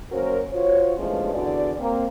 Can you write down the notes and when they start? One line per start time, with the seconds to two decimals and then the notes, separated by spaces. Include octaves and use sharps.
0.12 F#2 A#3 C#4 F#4 A#4 C5
0.53 F4 F#4 C5 C#5
0.98 E2 G2 F3 G#3 A3 C#4
1.34 E2 D3 F#4 D5
1.79 A#3 C4